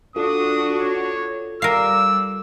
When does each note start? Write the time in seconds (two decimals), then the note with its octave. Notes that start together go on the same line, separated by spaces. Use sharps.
0.16 D4 F4 F#4 A4 D#6
0.81 C#5
1.62 G3 A#4 D5 F5 E6